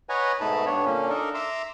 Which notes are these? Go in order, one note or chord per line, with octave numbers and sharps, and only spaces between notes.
B4 C#5 D#5 F#5 G#5 A#5
G#2 B2 A3 D#4 A5 B5
G2 B3 D4 C#5
A#2 D3 A#3 C#4
D4 D#4 A4 A#4
E5 A#5 C6 D6 E6